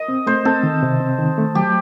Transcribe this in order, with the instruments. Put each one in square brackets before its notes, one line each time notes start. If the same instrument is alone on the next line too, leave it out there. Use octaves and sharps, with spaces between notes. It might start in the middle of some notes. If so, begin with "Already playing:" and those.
Already playing: [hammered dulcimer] D#5
[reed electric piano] C4
[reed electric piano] A3 [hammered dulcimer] C5
[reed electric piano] C4 [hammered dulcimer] A4
[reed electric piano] D#3
C3
C4
D#3
A3
[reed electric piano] F#3 [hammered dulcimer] G4